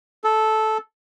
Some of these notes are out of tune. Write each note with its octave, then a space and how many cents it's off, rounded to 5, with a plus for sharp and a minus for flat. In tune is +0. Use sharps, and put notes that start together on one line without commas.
A4 -10